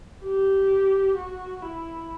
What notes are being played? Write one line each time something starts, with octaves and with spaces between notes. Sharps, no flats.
G4
F#4
E4